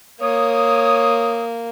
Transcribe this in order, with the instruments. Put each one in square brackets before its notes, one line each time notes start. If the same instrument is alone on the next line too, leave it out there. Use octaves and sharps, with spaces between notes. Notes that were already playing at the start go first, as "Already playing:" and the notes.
[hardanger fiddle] A#3 [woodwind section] C#5 D#6